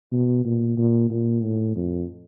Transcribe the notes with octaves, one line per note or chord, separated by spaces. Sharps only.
B2
A#2
A#2
A#2
A2
F2